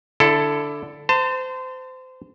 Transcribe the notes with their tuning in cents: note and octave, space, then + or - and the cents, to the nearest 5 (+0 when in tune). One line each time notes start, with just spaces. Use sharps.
D3 +0 E4 +20 A4 +0
C5 -25 A5 +30